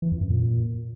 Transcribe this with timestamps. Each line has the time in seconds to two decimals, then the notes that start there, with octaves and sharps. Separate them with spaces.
0.02 E3
0.11 F2
0.21 F#2
0.30 A#2